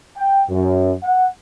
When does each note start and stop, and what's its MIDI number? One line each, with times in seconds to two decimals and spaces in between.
0.17 0.43 79
0.49 0.94 42
1.03 1.26 78